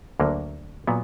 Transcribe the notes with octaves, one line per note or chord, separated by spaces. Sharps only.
D2 D3 F#3 A#3
A#2 F#3 B3